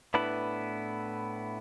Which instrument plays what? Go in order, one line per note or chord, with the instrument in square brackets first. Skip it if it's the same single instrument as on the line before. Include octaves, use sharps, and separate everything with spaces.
[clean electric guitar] A2 B3 D4 E4 B4 B5